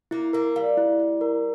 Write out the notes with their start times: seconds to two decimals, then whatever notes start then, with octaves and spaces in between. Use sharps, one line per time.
0.11 A#3 E4
0.33 A#3 A#4
0.56 G3 F5
0.77 E4
1.00 E4
1.21 A#4